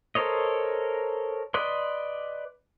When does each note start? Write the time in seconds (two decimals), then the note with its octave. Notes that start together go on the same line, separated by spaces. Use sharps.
0.15 A4 A#4 C5 C#5 D#5
1.54 B4 D5 D#5 C6